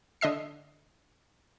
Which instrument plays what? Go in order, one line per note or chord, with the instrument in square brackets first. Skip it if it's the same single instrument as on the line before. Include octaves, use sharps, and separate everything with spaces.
[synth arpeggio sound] D3 D#5 E5 C7